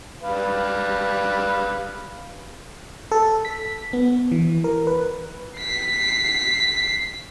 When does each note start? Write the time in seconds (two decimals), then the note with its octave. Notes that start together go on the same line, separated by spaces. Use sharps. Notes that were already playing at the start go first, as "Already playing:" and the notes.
0.22 G3 B4 F5
3.11 A4
3.45 B6
3.93 B3
4.32 E3
4.64 A#4
4.87 B4
5.57 B6 C7